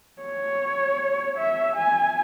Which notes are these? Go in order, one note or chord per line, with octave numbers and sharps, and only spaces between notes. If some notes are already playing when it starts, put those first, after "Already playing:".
C#5
E5
G#5